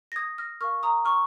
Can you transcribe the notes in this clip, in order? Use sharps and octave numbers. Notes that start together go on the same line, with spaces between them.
A#6
D#6 G#6
F6 A#6
A#4 F5 C#6 F6
A#5 D#6
C#6 F6